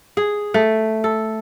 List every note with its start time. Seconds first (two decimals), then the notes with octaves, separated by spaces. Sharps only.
0.17 G#4
0.54 A3
1.04 A4